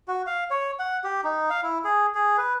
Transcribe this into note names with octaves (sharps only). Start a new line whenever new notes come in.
F#4
F5
C#5
F#5
G4
D#4
F5
E4
G#4
G#4
B4